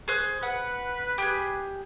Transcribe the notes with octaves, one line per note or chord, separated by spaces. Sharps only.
G#4 C5 F#6
B4 F#5
G4 G#4